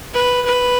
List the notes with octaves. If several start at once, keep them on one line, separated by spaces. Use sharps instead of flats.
B4
B4